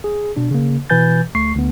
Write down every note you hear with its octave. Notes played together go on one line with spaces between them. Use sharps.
G#4
B2 D4
C#3 A#3
B2 E3 B4 G#5 G6 A6
D2 A3 C#6 C7
D2 B3